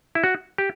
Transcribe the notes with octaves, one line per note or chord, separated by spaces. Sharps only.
E4
F#4
G4